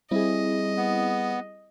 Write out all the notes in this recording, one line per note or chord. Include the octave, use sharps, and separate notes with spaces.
G3 C4 E4 G#4 D#5
B3